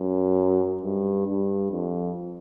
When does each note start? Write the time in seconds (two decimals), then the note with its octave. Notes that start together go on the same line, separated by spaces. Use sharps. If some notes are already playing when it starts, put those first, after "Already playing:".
Already playing: F#2
0.83 G2
1.27 G2
1.71 F2